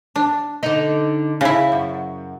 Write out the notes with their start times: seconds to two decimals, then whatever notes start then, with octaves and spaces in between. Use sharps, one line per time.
0.16 D4
0.63 D3 D#4
1.41 C#3 E4
1.72 F#2